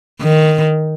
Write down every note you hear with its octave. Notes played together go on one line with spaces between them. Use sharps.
D#3